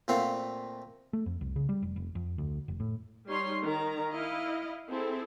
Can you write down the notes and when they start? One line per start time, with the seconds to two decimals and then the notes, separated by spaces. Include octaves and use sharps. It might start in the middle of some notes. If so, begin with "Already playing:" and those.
0.08 A#2 A3 C4 F4 F5 F#5
1.13 A3
1.26 F2
1.41 C2
1.56 C#3
1.69 G3
1.82 F1
1.96 F1
2.15 F2
2.38 D2
2.68 F1
2.80 A2
3.28 G3 D#4 C#5 C6
3.63 D#3 A#5
4.12 E4 D#5 F5
4.90 C4 E4 G#4 A4 C5